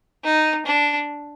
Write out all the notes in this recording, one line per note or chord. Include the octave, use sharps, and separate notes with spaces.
D#4
D4